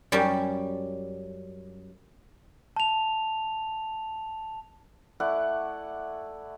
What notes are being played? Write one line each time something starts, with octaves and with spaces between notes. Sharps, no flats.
F#2 G3 C#4 G4
A5 F7
A3 E4 D5 F#5